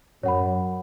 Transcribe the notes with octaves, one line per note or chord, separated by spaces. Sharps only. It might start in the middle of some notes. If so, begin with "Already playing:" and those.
F#2 C#5 F#5 B5